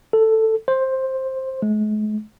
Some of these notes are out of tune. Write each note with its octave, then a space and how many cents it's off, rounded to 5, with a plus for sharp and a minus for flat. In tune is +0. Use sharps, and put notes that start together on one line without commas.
A4 +10
C5 +10
G#3 +45